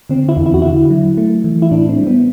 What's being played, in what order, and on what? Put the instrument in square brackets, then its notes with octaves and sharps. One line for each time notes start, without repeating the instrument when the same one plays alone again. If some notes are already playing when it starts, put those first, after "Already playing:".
[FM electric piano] D3 C4
E4
E2
E4
F#4
D3 E4
F#3
A3
E3
E4
A2 D4
C4
G3
B3